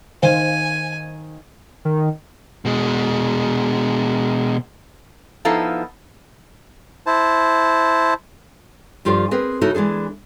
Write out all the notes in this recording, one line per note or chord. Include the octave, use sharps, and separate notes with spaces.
D#3 C5 F5 G#5
D#3
B2 G#3
F3 B3 D#4 E4 A4 F5
E4 C5 A5
G2 F3 F4 G4 A4 D5
C4 G#4 A#4 B4
C#3 D#4 E4 F#4 A4 A#4
E3 G#3 D4 G#4